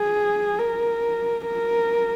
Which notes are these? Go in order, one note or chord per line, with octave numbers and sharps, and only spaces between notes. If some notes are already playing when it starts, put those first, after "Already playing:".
Already playing: G#4
A#4
A#4